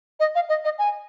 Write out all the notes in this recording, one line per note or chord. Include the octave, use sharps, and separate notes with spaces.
D#5
F5
D#5
D#5
G#5